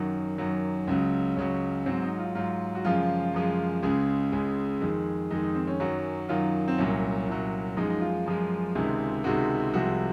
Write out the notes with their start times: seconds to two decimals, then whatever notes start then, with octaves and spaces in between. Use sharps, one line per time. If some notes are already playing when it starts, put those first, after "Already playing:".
Already playing: F#2 D#3 F#3
0.38 F#2 D#3 F#3
0.87 C#2 C#3 F#3
1.37 C#2 C#3 F#3 C#4
1.86 G#2 F#3 C4
2.02 D#4
2.19 F4
2.35 G#2 F#3 F4
2.75 F#4
2.85 F#2 C#3 F3 G#3 F4
3.34 F#2 C#3 F3 G#3
3.82 C#2 C#3 G#3 G#4
4.32 C#2 C#3 G#3
4.81 F2 D#3 G#3
5.30 F2 D#3 G#3 D#4
5.43 D#4
5.55 C4
5.67 C#4
5.80 F#2 D#3 F#3
6.29 F#2 D#3 F#3 F4
6.68 C4
6.78 C2 A#2 F#3 C#4
7.28 C2 A#2 F#3
7.77 F#2 F3 G#3 D#4
7.90 D#4
8.01 F4
8.26 F#2 F3 G#3
8.75 C#2 C3 D#3 G#3
9.24 C#2 C3 D#3 G#3 F#4
9.73 C2 C3 F3 G#3 F#4